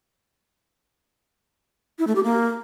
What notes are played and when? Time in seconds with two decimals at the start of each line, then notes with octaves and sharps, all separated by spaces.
1.99 E4
2.07 A3
2.16 G4
2.24 A#3